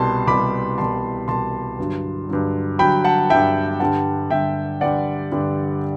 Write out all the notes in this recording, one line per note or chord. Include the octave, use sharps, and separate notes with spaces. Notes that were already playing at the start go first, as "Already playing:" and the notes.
Already playing: C2 B2 G3 A5 C6
C2 B2 G3 B5 D6
C2 B2 G3 A5 C6
C2 B2 G3 A5 C6
G2 D3 F#3
G2 D3 F#3
G2 D3 F#3 G5 B5
F#5 A5
G2 D3 F#3 E5 G5
G2 D3 G3 F#5 A5
G2 D3 G3 E5 G5
G2 D3 G3 D5 F#5
G2 D3 G3